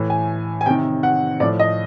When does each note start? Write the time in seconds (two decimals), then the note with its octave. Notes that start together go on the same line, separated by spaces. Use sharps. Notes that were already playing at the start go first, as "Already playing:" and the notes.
Already playing: A2 E3
0.10 G#5
0.61 G#5
0.66 C3 D#3 G5
1.03 F#5
1.40 A2 F3 D5
1.60 D#5